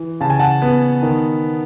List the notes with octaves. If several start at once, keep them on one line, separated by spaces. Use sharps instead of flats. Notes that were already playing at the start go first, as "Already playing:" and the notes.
Already playing: E3
C#3 A5
G#5
F#5 A5
B3
D#3